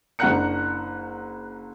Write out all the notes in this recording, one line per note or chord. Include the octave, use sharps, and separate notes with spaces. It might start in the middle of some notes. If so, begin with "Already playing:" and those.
F#1 D4 F#5 A#5 F#6 C#7